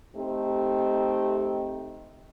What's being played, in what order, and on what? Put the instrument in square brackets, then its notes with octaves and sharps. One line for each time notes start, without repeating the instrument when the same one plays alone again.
[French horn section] A3 C4 D#4 G4